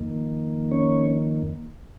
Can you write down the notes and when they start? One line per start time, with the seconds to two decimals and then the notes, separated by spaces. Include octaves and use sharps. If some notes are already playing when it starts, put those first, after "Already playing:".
Already playing: F2 D#3 A#3
0.71 C#4 C#5